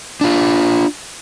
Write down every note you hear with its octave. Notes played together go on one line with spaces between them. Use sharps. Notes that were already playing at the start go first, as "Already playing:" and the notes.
D4 F4